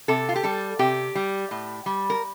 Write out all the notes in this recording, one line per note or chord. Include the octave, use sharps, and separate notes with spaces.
C3 A4
F4
G4
G3 A4
C3 G4
G3
A2
G3
A#4